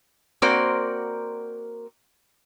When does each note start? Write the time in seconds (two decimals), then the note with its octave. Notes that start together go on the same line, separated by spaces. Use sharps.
0.42 A#3 C4 F#4 A#4 C5 D5